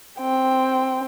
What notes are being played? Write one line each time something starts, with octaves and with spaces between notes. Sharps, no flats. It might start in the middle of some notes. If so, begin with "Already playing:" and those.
C4 G5